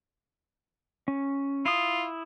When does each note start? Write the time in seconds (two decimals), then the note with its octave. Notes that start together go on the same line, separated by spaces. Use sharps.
1.08 C#4
1.65 E4 F4 D#6